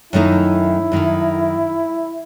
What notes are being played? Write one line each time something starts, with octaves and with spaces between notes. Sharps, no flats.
F#2 D#3 A3 D#4 E4
F#2 D#3 A3 D#4